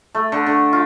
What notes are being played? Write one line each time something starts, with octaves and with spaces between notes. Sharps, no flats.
A3
D3
D3
F4